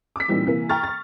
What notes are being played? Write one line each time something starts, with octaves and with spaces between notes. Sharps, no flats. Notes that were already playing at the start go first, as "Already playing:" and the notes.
D6 E6 B6
A#2 E3 G3 C4 D#4
C3 E3 A#3
G5 A#5 C#6 F6 A6
C#6 A6